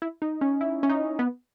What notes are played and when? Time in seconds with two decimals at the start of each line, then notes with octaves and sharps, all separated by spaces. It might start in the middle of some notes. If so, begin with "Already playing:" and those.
0.02 E4
0.22 D#4
0.41 C#4
0.61 E4
0.83 C#4
0.89 D#4
1.19 B3